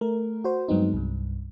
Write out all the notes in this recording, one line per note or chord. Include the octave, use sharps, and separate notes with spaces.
A3 A#4
F#4 C5
G2 F#3 G#3 B3 C4 D#4
C2 G2